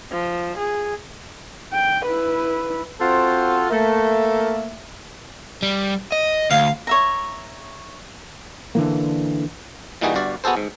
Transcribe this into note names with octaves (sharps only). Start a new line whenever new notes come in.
F3
G#4
G5
E4 B4
C4 F4 F#4 A4 C5 F#5
A3 A#3 E5
G3
D#5
D2 F5
C#5 E5 A#5
D3 E3 A#3
A#2 E3 G3 D#4 F#4 G#4
G1 G2 F#4 D5
B3 F#4 G#4 A4 C5
G#2